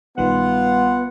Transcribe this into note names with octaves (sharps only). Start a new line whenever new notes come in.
A#1 D#3 G3 B3 F4 F#5